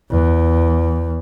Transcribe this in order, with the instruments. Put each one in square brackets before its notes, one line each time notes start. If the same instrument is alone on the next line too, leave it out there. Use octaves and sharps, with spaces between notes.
[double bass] E2